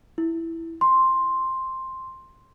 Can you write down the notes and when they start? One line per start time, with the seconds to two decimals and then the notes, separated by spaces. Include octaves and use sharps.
0.18 E4
0.81 C6